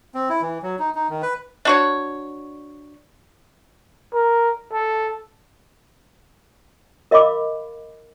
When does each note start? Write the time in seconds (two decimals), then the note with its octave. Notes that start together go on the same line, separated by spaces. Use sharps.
0.15 C4
0.30 E4
0.41 E3
0.62 F#3
0.79 D#4
0.95 D#4
1.10 D#3
1.23 B4
1.65 D4 F#4 C#5
4.14 A#4
4.73 A4
7.11 A#4 D#5 F5 B5 D6